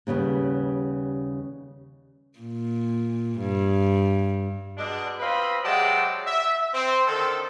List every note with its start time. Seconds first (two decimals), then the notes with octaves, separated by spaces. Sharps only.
0.07 D#2 C#3 G3 B3
2.39 A#2
3.40 G2
4.78 B2 G#3 D4
5.20 C4 F4 B4 D#5 B5
5.64 C3 F#3 G#3 D5 G5 A5
6.27 E5
6.74 C4
7.07 D3 D#3 C4 A4